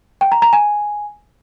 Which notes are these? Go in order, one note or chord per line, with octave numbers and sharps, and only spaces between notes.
G5
A#5
A#5
G#5